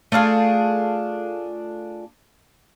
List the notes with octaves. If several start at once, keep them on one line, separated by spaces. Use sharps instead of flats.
A3 D4 F4 G#4